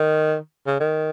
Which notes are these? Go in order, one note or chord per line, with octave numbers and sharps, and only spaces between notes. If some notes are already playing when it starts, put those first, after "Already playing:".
Already playing: D#3
C#3
D#3